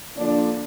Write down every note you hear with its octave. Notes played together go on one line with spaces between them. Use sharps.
D3 F3 A#3 D4